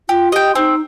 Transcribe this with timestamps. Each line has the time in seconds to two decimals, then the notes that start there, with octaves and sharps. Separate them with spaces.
0.09 F4 G4
0.32 G4 D#5 G5
0.55 C4 D#4